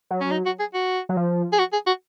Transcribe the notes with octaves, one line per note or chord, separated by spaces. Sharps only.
F#3
C#4
D#4
F#4
G#4
F#4
F#3
F3
G#4
F#4
G#4
F#4